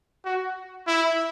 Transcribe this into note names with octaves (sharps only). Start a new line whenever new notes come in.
F#4
E4